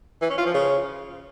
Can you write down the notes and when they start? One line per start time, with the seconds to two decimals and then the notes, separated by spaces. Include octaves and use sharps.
0.21 E3
0.30 C#4
0.38 F4
0.46 F3
0.54 C#3